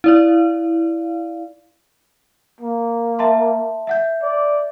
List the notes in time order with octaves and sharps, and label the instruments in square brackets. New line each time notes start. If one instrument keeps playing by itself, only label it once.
[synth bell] E4 D5 F5
[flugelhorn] A#3
[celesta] E5 A5 C6
E5 F#5 G6
[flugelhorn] D5